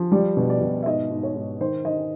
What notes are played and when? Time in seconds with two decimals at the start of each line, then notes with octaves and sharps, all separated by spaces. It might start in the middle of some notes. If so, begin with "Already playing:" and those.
Already playing: F3
0.12 G3 D5
0.37 B2
0.50 D5
0.61 B2
0.83 E5
0.86 G#2 D#5
1.11 G#2
1.23 C#5
1.36 G#2
1.60 D#3 C5
1.85 D#3 D#5